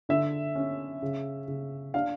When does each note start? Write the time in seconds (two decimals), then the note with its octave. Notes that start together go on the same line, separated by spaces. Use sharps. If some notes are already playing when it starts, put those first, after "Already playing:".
0.09 D3 E5
0.55 C#4
1.02 C#3
1.48 C#3
1.94 D4 F5